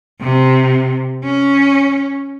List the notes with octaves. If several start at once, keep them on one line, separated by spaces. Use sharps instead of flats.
C3
C#4